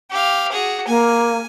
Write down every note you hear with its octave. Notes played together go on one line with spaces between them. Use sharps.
G4 F5
F#4 G#4
A#3 G#5